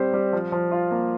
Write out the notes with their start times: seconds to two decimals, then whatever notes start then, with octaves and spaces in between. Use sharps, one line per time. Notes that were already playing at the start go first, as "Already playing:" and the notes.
Already playing: G3 C4 G4 C5
0.13 G3
0.33 F3
0.52 F3
0.72 F4
0.91 A#3